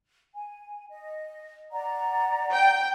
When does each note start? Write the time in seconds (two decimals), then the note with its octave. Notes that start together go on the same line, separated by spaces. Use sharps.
0.34 G#5
0.89 D#5
1.72 D5 F#5 A#5
2.52 G5